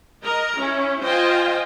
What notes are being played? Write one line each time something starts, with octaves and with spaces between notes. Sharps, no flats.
A#4 D#5 A#5
C#4 E4
F4 C5 D#5 F5 G5 G#5